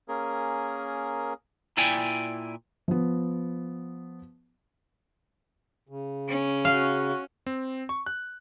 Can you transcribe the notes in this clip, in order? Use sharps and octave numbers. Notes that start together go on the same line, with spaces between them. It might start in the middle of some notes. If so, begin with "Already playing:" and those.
A#3 C#4 G#4 A#4
A#2 E4 D5 G5 G#5
F3 B3
C#3
C#4
F#4 F5
C4
C#6
F#6